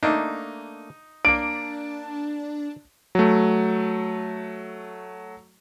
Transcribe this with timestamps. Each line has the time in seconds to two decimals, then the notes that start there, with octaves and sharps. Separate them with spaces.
0.03 A3 A#3 D4 D#4
1.25 A#3 D4 D5 D7
3.15 F#3 A3